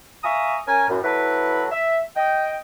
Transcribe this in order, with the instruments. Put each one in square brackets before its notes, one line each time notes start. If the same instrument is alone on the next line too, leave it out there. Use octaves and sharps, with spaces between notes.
[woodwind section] E5 F5 G#5 A#5 C#6 D#6
C#4 A#4 G#5
F#2 A2
F#3 E4 A4 B4
E5
D#5 G5